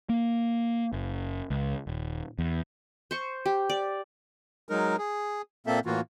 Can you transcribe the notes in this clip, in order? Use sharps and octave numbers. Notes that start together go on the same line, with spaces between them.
A#3
F#1
C#2
D#1
E2
C5 C#6
G4
D5
F#3 G#3 D#4 A#4
G#4
A#2 A#3 C4 A4 E5
A2 E3 A#3 F4 F#4